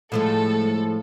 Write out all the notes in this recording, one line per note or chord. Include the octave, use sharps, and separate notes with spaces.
A2 F3 G#3 A4